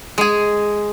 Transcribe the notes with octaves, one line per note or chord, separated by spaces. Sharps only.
G#3 G#4